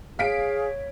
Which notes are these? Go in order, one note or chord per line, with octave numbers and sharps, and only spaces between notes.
G#4 C#5 F5 B6 D7